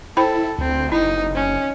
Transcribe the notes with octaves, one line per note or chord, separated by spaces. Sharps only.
E4 A4 C5 G5 B5
D2 C4
F#1 D#4 E4
C#4